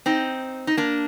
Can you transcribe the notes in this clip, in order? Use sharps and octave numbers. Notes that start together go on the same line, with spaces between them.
C4 D#4
D#4
A#3 D4